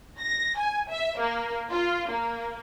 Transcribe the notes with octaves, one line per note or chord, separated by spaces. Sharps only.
A#6
G#5
E5
A#3
F4
A#3